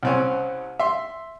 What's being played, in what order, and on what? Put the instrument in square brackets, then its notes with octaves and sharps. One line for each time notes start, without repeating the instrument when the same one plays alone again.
[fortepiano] C2 C4 C#4
E5 C6